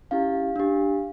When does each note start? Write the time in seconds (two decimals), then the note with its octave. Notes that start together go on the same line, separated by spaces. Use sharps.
0.11 C#4 E4 G4 F5
0.56 D4 G4